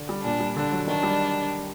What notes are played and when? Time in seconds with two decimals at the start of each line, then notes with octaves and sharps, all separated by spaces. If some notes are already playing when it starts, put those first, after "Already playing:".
Already playing: D3
0.09 G3
0.24 A#2 D4
0.40 G3
0.57 D3 D4
0.72 F#3
0.87 D#3 D4
1.03 G3